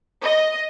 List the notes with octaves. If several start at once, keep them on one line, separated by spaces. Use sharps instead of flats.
D#5